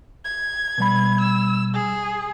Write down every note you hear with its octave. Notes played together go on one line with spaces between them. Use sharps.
G#6
B2 G3 B5
E6
G#4